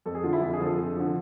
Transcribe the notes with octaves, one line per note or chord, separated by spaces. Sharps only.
F2 A4
G#4
D3 F3 F4
E4
F2 F4
G#4
D3 F3
A4
F2
D3 F3